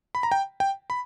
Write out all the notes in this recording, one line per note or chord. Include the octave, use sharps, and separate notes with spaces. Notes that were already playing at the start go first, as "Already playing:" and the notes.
B5
A#5
G5
G5
B5